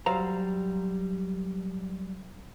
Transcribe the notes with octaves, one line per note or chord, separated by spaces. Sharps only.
F#3 G3 C5 F5 A#5